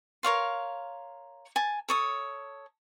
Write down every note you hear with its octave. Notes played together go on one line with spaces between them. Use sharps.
A#4 C#5 F5 C6
G#5 A5
A4 C#5 D#6